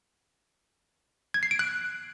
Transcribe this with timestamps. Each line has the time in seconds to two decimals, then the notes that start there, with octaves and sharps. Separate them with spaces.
1.34 G#6
1.43 C7
1.51 D7
1.59 F#6